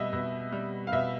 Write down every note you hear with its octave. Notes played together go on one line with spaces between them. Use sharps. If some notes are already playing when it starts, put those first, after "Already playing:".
Already playing: B2 G3 D#5 E5
B2
G3
F5
B2 E5